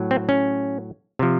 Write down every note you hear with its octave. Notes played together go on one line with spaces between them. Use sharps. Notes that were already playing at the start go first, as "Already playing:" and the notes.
Already playing: A2 F#3
C4
C#4
C3 F3